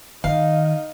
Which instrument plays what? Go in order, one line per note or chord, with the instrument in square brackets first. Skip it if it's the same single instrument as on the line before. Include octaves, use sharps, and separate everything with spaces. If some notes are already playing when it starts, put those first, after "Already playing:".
[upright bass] D#3 [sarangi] D#4 [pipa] F5